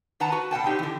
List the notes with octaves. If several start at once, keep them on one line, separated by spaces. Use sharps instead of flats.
D#3 B4 F#5 A5 A#5
F#4 B4
B2 F#5 G5 A5
C4 D4 D#4 G4
D3 E3